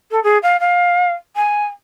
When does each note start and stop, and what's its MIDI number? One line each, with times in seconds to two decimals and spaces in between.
0.11 0.22 69
0.23 0.38 68
0.42 0.59 77
0.60 1.12 77
1.36 1.65 80